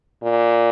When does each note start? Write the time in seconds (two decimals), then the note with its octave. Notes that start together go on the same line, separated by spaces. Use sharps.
0.23 A#2